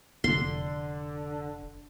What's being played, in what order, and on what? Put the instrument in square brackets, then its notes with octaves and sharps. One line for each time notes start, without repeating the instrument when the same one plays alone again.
[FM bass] F1 [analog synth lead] D3 [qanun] C6